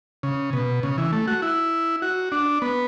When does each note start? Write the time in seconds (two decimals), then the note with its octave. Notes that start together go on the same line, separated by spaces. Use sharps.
0.23 C#3
0.53 B2
0.83 C#3
0.98 E3
1.12 A3
1.28 F#4
1.42 E4
2.02 F#4
2.32 D4
2.62 B3